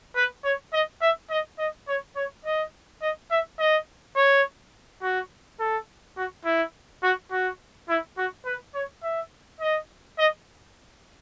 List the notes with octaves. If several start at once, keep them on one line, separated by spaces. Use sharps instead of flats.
B4
C#5
D#5
E5
D#5
D#5
C#5
C#5
D#5
D#5
E5
D#5
C#5
F#4
A4
F#4
E4
F#4
F#4
E4
F#4
B4
C#5
E5
D#5
D#5